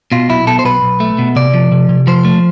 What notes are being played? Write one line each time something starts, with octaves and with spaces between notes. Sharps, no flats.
B2 F4
B1 E4
B2 A4
C5
B1 B4
B1
A3
B2
C3 D5
F3
C3
C3
F3 C5
A3